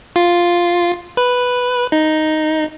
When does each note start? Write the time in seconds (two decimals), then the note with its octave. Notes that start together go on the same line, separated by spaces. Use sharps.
0.16 F4
1.17 B4
1.92 D#4